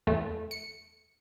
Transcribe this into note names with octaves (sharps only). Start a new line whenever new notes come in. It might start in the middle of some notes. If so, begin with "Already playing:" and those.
E2 A3
C#7